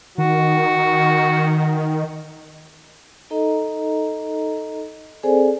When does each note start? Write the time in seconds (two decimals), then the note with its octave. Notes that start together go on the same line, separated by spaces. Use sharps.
0.18 D#3 F#4
3.30 D#4 A4 D#5 A#5
5.23 C4 G#4 A4 C5 D5 G#5